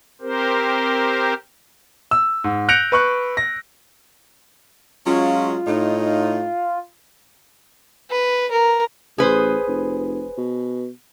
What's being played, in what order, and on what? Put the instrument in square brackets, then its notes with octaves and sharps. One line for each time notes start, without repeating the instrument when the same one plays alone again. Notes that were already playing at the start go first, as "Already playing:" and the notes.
[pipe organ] C4 G4 A#4 C5
[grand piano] E6
G#2
F#6 G6 A#6 C#7 D7 F7
B4 C#6 F#6
A#6
[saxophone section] F#3 G#3 C#4 [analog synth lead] F4
[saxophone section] A2 D#4
[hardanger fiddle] B4
A#4
[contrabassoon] A1 [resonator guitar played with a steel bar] G#4 B4 C5
[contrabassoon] F1
B2